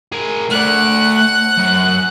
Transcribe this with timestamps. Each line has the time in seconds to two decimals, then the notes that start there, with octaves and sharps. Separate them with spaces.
0.12 G#4 A#4
0.50 A3 D5 F#5 F#6
1.57 F#2